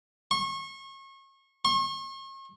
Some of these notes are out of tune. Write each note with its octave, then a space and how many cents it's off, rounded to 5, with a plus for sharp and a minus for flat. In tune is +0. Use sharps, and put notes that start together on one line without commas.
C#6 -35
C#6 -45